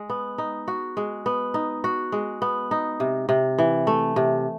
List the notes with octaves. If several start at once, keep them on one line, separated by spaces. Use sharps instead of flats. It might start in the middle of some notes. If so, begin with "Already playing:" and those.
Already playing: G#3
B3
D#4
F#4
G#3
B3
D#4
F#4
G#3
B3
D#4
C3
C3
E3
A3
C3